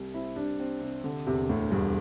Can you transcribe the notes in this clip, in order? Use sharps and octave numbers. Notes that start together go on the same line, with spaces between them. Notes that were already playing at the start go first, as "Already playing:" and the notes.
Already playing: C2 G3
C4 E4
G3 D4
C4
C3
D3
E1 C3
D2 A2
E1 G2